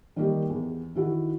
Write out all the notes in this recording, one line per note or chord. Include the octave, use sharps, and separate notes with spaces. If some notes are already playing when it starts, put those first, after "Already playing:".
D#3 G3 A#3 D#4 G4
E2
D#3 E4 F#4